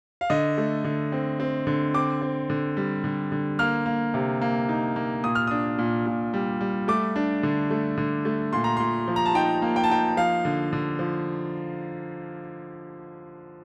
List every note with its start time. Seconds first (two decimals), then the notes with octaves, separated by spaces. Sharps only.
0.21 F5
0.30 D3 D#5
0.58 A3
0.84 D3
1.12 C4
1.40 C4
1.67 D3
1.94 C4 D6
2.22 C4
2.50 D3
2.77 G3
3.04 D3
3.32 D3
3.59 A#3 F6
3.86 A#3
4.14 C3
4.42 A#3
4.69 D#4
4.96 A#3
5.24 A#2 D#6
5.35 F6
5.47 D4 D#6
5.78 A#2
6.06 A#2
6.34 G3
6.61 G3
6.88 A3 D6
7.16 D4
7.43 D3
7.70 A3
7.97 D3
8.25 A3
8.53 A#2 C6
8.64 A#5
8.77 A#2 C6
9.08 F3
9.16 A#5
9.26 A5
9.35 D#4 G5
9.62 A#3
9.76 G5
9.84 A5
9.90 D#4 G5
10.17 F3 F5
10.45 D3
10.73 D3
10.99 F3